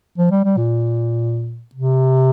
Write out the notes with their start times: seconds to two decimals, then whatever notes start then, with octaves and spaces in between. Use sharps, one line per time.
0.18 F3
0.31 G3
0.44 G3
0.57 A#2
1.75 C3